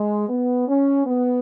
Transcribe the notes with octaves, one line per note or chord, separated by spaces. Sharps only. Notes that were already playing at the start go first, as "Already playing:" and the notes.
Already playing: G#3
B3
C#4
B3